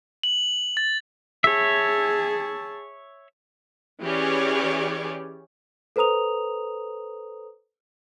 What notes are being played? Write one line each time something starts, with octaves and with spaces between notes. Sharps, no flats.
F#7
A6
G#4 C#5 E5 A5
E3 C#4 G4 G#4 C#5 D5
A4 B4 C5 A#5 D#6 F7